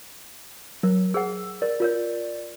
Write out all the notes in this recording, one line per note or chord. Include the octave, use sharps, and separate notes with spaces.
F#3 A#4
G#4 C5 F#5 E6
A#4 D5
F4 A#4 C#5